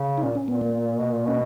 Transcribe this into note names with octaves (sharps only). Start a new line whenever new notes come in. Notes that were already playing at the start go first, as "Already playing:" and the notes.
Already playing: C#3
D#4
A#2 C#4
C#4
A#2 B3
A#3
B2
A#2
B2 C#4